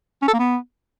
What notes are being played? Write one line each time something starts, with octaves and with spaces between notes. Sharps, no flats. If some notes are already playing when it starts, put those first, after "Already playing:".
C#4
A4
A#3
B3